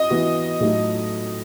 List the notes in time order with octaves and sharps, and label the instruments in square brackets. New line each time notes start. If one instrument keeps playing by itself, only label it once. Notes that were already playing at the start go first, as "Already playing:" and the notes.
Already playing: [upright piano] D#5
[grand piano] E3 B3 F#4
A2 F#3 A3 D#4 A4